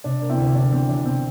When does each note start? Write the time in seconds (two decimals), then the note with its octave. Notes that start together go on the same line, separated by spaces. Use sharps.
0.04 C3 D4
0.21 A#3
0.30 C4 E4
0.38 D2
0.55 D2 D4
0.72 E3 C4
0.89 E3 D4
1.06 C3 C4